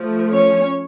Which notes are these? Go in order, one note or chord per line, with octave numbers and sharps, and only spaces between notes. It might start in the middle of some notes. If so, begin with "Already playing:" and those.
Already playing: F3 A3
C#4 C#5